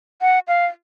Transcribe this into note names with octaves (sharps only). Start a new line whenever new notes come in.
F#5
F5